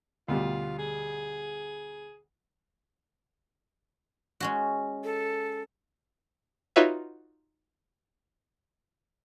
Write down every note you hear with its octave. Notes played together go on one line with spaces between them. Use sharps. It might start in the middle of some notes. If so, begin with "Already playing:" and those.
D2 B2 G3 F4
G#4
G#3 C#4 F#4
A4
D#4 F4 F#4 B4 C#5 E5